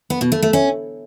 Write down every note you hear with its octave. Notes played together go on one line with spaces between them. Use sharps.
B3
B2
A3
A3
C#4